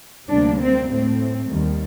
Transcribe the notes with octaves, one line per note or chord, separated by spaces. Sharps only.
D2 C3 G3 A#3 D4
C4
A2 A3 C4
D#2 D#3 G3